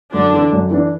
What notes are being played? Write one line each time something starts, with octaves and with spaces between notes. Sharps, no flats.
F#2 D3 D4
E3
D4
F#2
E3 D4